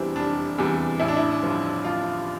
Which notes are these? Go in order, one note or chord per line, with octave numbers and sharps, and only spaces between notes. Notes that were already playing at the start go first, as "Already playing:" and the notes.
Already playing: F1 E2 C3 E3 G3 C4 D4 E4
F1 D4
E2 C3 E3 G3
A1 E4
D4
E4
G2 D3 F3
A1 F4